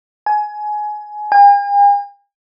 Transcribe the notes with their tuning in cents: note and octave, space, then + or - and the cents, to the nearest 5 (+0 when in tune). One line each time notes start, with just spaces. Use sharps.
G#5 +20
G#5 -45